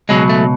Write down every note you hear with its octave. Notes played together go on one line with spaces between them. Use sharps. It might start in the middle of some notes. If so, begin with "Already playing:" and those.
C#2 B2 F#3 G#3
A3